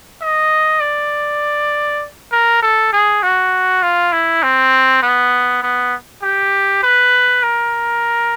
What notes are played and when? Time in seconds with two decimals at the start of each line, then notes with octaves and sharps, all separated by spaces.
0.22 D#5
0.81 D5
2.32 A#4
2.62 A4
2.93 G#4
3.23 F#4
3.82 F4
4.12 E4
4.43 C4
5.03 B3
5.63 B3
6.23 G4
6.83 B4
7.43 A#4